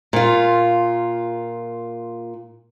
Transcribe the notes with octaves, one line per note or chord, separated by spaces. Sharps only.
A#2 F4